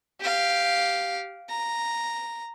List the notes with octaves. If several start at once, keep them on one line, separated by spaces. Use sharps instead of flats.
G4 F5
A#5